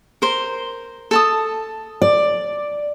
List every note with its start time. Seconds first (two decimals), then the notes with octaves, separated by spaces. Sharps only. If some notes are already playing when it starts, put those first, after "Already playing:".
0.22 A#4 C5
1.11 A4 A5 D#6
2.02 D5